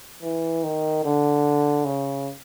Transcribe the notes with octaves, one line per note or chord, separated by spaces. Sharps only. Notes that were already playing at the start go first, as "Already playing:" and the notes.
E3
D#3
D3
C#3